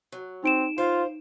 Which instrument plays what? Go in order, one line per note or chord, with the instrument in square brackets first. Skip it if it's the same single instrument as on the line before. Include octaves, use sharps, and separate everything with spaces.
[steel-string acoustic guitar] F#3
[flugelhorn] C4 [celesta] D#4 D7 E7
[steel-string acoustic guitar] G2 C5 F5 [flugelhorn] F4